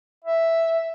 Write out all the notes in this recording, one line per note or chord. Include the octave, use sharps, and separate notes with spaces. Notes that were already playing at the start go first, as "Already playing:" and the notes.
E5